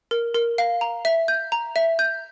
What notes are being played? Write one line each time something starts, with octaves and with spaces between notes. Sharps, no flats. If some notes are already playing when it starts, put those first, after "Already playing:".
A#4
A#4
F5
A#5
E5
G6
A#5
E5
G6